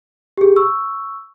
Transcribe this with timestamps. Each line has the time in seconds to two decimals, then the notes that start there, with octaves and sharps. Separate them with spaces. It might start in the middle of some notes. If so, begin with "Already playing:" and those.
0.37 G4 G#4
0.56 C#6 E6